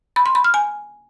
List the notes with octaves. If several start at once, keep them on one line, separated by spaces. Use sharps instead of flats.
B5
C6
B5
F6
G#5